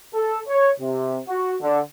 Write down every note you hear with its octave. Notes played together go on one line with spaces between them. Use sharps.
A4
C#5
C3
F#4
D3